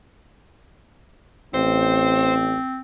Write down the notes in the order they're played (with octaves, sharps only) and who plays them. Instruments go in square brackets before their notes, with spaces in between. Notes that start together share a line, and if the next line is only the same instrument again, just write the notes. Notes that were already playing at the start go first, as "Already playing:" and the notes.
[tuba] A1 [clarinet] C4 [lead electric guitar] C5